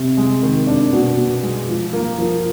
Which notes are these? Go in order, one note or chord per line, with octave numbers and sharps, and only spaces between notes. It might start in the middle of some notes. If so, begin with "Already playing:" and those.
Already playing: C3
G#3
D#3
D4
B2
B2
G#3
F3
A#3
F3